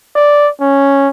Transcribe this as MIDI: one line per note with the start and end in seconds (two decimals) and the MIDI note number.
0.16 0.49 74
0.61 1.09 61